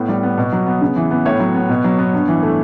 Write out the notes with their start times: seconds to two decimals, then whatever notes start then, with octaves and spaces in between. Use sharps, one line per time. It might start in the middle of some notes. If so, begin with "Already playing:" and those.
Already playing: A2 B3
0.08 G3
0.23 B3
0.38 B2
0.52 F#3
0.66 B3
0.81 C#3
0.96 E3
1.11 B3
1.25 A2 C#5
1.40 F#3
1.55 B3
1.69 B2
1.84 F#3
1.99 B3
2.13 G2
2.28 E3
2.43 A3